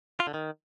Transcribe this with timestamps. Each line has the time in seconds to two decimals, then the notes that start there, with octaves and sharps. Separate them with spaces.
0.20 F4
0.27 D3
0.34 D#3